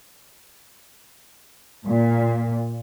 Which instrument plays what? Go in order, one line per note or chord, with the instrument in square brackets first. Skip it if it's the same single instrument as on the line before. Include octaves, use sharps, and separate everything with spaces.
[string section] A#2